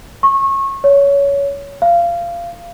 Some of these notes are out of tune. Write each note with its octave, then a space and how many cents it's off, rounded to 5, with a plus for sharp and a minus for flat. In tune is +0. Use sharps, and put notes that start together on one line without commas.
C#6 -25
C#5 +20
F5 -20